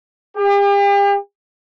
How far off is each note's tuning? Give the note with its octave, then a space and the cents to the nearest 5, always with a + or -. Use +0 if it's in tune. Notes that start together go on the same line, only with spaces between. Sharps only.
G4 +40